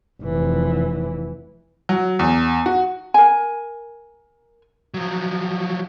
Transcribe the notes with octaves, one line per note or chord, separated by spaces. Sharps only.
F1 E3
F#3
E2
F#4
A#4 G#5
F3 F#3